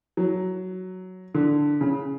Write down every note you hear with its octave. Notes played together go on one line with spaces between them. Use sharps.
F#3
D3
C#3